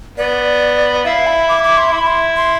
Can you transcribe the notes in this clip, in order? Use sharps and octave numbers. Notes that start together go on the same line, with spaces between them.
B3 D5
E4 F5
B5
D6
D6
C6
E4 B5
C6
C6